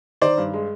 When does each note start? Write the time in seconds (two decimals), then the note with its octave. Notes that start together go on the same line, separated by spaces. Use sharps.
0.22 D#3 C5 D5
0.37 G2
0.54 G#3